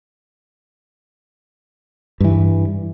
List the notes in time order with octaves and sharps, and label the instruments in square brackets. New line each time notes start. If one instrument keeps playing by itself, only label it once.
[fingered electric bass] G2 E3